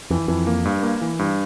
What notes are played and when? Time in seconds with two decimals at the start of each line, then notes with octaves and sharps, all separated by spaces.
0.10 F2 E3
0.28 F2 E3
0.47 A#3
0.65 G2
0.83 A#3
1.01 E3
1.19 G2